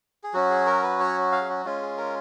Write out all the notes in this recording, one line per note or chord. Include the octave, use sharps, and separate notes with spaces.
G#4
F#3 C#4 F#4
G#4
A#4
B4
C#5
F5
G#4
F#4
G#3 C#4 F4
G#4
A#4